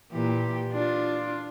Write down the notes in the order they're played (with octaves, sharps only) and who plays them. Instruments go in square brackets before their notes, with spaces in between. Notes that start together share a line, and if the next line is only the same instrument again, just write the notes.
[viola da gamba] A#2 E3 G4
D4 F4